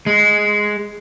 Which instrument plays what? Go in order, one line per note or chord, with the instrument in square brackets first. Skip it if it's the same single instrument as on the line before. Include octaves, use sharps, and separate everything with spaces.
[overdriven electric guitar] G#3